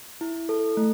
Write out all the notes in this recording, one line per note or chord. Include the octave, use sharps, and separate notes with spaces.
E4
A4
A3